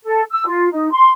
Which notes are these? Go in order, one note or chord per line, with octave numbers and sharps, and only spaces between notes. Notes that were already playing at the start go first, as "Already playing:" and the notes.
A4
E6
F4
D#4
C6